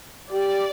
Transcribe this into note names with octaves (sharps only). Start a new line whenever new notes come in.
G4 D5